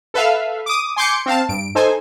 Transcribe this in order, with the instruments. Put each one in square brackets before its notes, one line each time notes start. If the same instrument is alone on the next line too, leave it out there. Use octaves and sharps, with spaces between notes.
[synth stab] A4 B4 E5 F5
D6 D#6
G#5 C6 D6 G6 C#7
C4 F5 A5
G2 D7
D#4 A4 C5 G#5